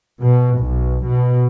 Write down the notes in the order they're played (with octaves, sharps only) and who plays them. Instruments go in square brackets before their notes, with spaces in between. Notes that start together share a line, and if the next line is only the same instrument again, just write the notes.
[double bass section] B2
B1
B2